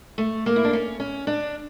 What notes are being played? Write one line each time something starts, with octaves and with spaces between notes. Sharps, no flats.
A3
A#3
E4
D4
C#4
C#4
D4